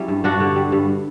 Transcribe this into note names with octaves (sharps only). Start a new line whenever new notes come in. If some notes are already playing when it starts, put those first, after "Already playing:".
Already playing: F#3 G3 C#4 E4
G2
G2 D4 F#4
D3
G3
G2